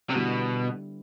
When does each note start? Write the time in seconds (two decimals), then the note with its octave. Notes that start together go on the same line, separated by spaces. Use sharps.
0.10 C3
0.14 B2 D3 G3 B3 E4